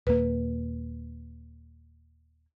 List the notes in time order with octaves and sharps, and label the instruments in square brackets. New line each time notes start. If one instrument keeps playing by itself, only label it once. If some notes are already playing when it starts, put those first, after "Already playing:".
[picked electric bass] D#1 A#3 [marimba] B4